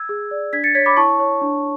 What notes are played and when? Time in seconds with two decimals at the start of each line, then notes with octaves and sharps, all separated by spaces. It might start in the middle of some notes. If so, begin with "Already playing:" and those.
Already playing: E6 G#6
0.09 G#4
0.31 D5
0.53 D4 G#6 B6
0.64 A6 C#7
0.75 C#5 G#6 B6
0.86 B5 D6
0.97 E4 A5 C#6
1.19 C#5
1.42 D4